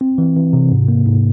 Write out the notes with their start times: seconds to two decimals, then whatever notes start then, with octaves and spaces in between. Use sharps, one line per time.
0.01 C4
0.18 E3
0.36 E3
0.53 C3
0.71 G#2
0.88 A#3
1.06 G#2